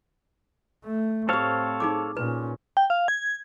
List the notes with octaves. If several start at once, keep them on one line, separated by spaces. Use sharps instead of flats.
A3
A2 C4 G4 A4 C5 C#5 F5
D#4 G#4 D6
A#2 C#4 B4
G5
F5
G#6